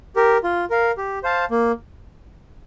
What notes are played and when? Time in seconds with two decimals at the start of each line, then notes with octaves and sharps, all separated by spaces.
0.16 G4 A#4
0.43 F4
0.70 A#4 F5
0.97 G4
1.23 C5 F5 A5
1.51 A#3